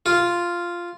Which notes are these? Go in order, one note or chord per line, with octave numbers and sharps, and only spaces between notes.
F4